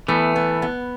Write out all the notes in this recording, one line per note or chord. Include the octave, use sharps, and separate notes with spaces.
E3 A3 B3
B3
B3